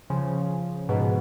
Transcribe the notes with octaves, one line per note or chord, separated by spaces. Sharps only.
C#3 F3
G#2 B2